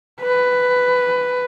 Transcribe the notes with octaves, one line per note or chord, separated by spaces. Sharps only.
B4